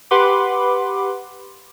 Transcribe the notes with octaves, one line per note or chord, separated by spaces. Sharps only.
G4 B4 F#5 B5 C6 D6